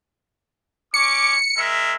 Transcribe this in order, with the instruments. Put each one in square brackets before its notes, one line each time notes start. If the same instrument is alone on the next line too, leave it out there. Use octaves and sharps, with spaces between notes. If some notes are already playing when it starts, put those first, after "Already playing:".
[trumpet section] C#4 C#6 D6 [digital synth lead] C#7
[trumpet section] G#3 A#4 E5